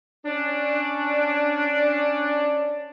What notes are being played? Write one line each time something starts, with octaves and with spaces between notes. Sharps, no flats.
C#4 D4